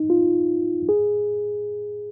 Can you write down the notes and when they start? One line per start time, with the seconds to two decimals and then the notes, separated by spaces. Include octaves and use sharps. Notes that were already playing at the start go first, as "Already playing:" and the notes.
Already playing: D#4
0.10 F4
0.89 G#4